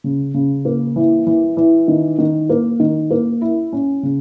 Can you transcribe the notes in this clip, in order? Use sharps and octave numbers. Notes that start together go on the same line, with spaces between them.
C#3
C#3
A#3
E3
E3
E3
D#3
D#3
A#3
D#3
A#3
E4
C#4
C#3